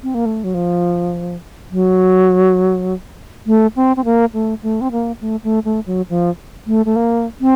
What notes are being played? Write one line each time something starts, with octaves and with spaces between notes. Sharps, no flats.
C4
A#3
A3
F#3
F3
F#3
A3
C4
C4
A#3
A3
A3
C4
A#3
A3
A3
A3
F#3
F3
A3
A3
A#3
C4